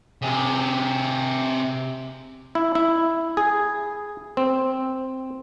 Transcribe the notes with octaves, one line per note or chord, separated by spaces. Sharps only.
C3 G#4
E4
E4
G#4
C4